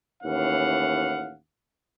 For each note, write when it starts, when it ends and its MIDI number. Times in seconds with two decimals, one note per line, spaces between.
0.23 1.34 39
0.23 1.34 45
0.23 1.34 52
0.23 1.34 61
0.23 1.34 77
0.23 1.34 78